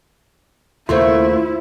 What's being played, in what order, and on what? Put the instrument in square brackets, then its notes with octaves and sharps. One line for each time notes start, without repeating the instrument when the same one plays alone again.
[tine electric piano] D#2 A#4 C5 [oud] C#3 A3 A#3 [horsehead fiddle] E4 [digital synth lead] F4